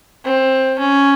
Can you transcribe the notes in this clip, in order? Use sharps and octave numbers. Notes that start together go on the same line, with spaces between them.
C4
C#4